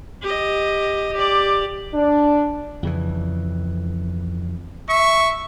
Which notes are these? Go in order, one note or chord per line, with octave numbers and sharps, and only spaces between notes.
G4 D#5
G4 D5
D4
F2 C#3 E3
E5 C#6